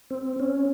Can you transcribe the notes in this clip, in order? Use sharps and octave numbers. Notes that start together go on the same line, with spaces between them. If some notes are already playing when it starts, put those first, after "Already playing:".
C4
C#4